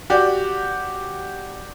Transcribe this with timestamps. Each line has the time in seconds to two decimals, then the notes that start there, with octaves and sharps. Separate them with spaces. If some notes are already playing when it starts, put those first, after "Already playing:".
0.10 F#4 G4 D5